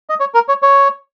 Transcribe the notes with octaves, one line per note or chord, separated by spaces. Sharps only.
D#5
C#5
A#4
C#5
C#5